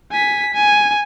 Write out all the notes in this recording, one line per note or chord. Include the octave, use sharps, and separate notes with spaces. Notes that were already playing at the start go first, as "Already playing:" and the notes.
G#5 B6
G#5